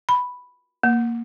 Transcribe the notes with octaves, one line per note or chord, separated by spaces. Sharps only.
B5
A#3